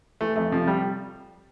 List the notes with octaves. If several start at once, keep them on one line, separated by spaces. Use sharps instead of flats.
E3 A3
F2 A3
C3 F3
G3